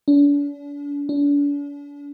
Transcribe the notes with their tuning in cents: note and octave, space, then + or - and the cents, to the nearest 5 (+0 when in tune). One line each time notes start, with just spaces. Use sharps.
D4 -40
D4 -40